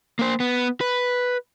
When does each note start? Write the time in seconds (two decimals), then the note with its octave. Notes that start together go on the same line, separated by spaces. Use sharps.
0.19 A#3 C5
0.40 B3
0.81 B4